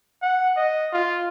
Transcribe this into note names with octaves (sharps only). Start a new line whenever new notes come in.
F#5
D#5
F4